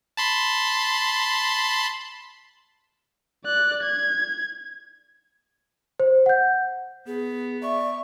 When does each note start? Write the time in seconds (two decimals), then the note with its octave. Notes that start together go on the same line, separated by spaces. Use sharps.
0.17 A5 B5 C6
3.45 D5 F#6
3.83 G#6
6.00 C5
6.26 F#5 G6
7.07 B3 G#4
7.62 D5 E5 C#6